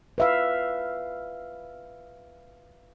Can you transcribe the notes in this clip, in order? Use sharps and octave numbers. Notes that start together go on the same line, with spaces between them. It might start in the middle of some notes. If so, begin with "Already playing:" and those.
B4 E5 F5